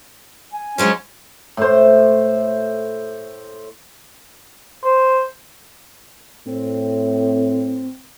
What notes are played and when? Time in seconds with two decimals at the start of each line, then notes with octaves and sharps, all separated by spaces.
0.53 G#5
0.78 F3 F#3 G#3 C#4
1.57 A2 C5
4.83 C5
6.46 A2 C4